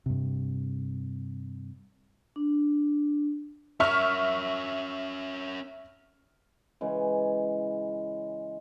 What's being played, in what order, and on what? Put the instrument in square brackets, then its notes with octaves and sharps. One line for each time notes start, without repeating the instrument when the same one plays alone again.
[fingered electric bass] G2 C3
[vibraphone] D4
[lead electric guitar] C#4 A#4 [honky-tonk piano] E5 C#6 F6
[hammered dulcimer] C#3 E3 G#3